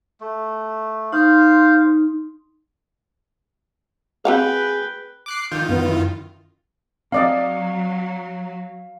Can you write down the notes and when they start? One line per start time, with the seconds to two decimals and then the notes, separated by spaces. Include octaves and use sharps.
0.21 A3
1.13 D#4 C5 F5 C6
4.25 C4 F#4 G#4 B4 F5 G5
5.26 D6 F#6 C7
5.51 D#3 F4 G6
5.69 F#2 B3
5.84 E4
7.12 F#3 C4 D5 D#5 F5